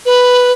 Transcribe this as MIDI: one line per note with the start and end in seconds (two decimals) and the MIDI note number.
0.05 0.52 71